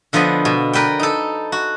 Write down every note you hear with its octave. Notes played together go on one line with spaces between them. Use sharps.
D3 F3 B3 D#5 B5
B2
A#4 B4 D5 G5
D#4 A4
F#4